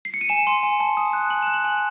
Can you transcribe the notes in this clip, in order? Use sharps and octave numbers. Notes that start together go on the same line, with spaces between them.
C7
C#7
D#7
G#5 E7
C6
G#5
A5
D#6
F#6
G#5 F#7
F#6 E7
F#7
G#5